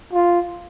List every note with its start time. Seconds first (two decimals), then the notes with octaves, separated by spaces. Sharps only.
0.13 F4